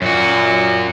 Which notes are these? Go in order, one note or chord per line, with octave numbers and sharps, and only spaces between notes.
F#2 A#2 F#4